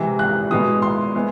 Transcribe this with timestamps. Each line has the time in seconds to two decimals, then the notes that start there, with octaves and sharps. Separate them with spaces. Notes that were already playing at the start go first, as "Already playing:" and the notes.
Already playing: C3 E3 G#3
0.19 F#6
0.51 B2 G#3 B3 E4 D#6
0.82 C6
1.15 G#3 B3 E4